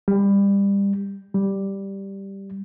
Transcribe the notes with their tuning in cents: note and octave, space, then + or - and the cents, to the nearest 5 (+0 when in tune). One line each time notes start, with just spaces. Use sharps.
G3 +25
G3 +0